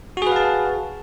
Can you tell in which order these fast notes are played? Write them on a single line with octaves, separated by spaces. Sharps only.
F#4 G#4 B4 F5 A5